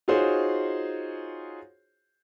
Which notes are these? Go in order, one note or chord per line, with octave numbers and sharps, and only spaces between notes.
D#4 F4 F#4 G#4 C5 C#5